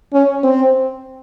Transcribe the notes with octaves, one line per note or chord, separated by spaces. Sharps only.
C#4
C4